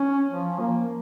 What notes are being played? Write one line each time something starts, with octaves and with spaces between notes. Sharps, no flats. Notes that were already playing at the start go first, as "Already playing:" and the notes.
Already playing: C#4
F3
A#3